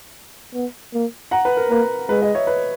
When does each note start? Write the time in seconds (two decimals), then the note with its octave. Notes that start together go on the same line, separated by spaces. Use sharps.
0.54 B3
0.94 A#3
1.31 F#5 A#5
1.45 B4
1.57 A#4
1.70 A#3 B4
2.09 G#3 B4
2.21 B4 D#5
2.35 C#5 E5
2.47 B4